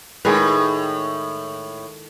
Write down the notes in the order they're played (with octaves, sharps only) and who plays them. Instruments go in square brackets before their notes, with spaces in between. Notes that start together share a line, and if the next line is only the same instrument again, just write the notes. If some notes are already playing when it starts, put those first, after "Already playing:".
[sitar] A2 [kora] D#3 G#3 B4